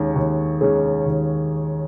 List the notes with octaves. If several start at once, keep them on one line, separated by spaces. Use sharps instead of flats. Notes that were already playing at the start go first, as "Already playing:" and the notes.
Already playing: D#2 D#3 G#3 C#4 G#4
D#2
D#3 G#3 C#4 G#4
D#2